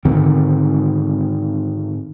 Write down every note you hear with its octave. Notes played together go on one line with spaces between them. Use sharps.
G#2 D3 D#3 C4